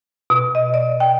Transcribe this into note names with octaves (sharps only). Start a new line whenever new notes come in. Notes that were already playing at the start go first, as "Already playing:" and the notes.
B2
D#5
D5
G5